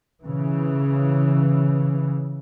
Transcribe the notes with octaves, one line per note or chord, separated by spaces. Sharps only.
C#3 E3